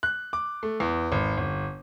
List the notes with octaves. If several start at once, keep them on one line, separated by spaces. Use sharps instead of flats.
F#6
D6
A3
E2
G#1
G1